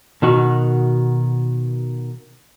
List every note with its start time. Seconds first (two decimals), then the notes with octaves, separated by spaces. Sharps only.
0.22 B2 D#3 F#4